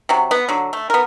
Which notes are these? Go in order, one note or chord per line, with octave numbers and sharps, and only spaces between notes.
C3 F#3
B3
D3 F#3
A3
B3 A#4